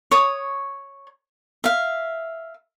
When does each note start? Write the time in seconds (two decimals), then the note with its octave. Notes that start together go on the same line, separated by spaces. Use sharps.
0.11 C#5 D#6
1.64 E5 F5